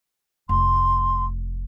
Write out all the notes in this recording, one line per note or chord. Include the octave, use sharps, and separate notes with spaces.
F1 C6